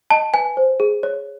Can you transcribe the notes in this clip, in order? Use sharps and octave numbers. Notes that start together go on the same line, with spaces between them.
D#5 A5
B4 G#5
C5
G#4
C#5